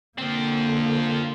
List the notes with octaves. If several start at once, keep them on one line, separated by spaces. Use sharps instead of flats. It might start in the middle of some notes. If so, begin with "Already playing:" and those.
D3 F3 A#3 C4